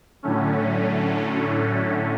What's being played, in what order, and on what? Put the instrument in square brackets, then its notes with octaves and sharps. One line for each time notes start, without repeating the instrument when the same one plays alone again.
[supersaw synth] A2 D3 F#3 A3 C#4